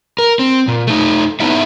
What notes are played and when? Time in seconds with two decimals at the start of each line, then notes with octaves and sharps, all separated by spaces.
0.19 A#4
0.39 C4
0.68 A#2
0.87 A3 D#4
1.40 B3 D#4 E4 E5